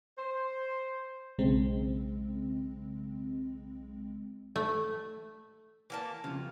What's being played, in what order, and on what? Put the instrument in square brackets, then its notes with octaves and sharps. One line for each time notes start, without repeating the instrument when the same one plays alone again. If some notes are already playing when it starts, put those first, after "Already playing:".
[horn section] C5
[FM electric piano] B1 C#3 G#3 C4
[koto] A3
[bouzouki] E3 A#3 A5
[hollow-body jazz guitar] F2 C#3 [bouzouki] F4